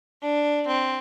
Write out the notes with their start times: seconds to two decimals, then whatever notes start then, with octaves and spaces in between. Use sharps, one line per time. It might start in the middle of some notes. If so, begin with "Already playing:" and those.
0.22 D4
0.67 C4